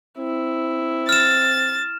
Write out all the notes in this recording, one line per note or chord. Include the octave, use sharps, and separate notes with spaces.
C4 E4
F6 A6 E7